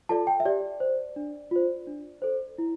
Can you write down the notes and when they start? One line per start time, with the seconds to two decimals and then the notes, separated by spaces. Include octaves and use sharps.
0.09 F4 A4 D5 A5
0.27 G5
0.40 E5
0.45 G4 D5
0.80 C5
1.16 D4
1.51 F4 C5
1.87 D4
2.22 A4 C5
2.58 E4